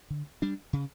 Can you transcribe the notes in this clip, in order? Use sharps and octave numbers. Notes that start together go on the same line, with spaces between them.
D3
G3 D4
C#3